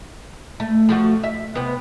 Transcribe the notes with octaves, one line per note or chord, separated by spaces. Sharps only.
A3
F3 A3 F#4
E5
C3 B3